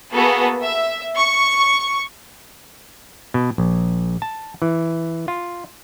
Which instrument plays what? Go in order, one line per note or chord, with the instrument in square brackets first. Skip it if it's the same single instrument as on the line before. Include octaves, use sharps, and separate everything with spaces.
[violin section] A#3 B3 F#4 G#4 A4 B4
E5
C#6
[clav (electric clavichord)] B2
A#1
A5
E3
F4